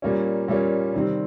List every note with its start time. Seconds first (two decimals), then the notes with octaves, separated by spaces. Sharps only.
0.02 A#2 G3 A#3 C#4
0.48 A#2 G3 A#3 C#4
0.94 C3 D#3 G3 C4